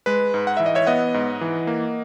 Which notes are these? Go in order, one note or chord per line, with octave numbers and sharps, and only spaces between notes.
G#3 B4
G#2
F#5
E3 E5
D#5
C#5 E5
B3 D#5 F#5
G#2
E3
A#3